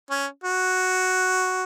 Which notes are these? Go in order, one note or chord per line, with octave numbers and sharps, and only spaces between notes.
C#4
F#4